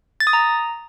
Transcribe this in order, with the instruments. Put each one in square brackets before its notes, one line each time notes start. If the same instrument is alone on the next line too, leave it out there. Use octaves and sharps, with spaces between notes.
[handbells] A6
D#6
A#5